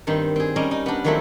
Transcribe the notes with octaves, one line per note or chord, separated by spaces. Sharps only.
G2 D#3 C4 D#4
C4 G#4
G3 C#4 A#4 D#5
D#4
B3 D4
D#3 F3 F#3 A3 C4 E4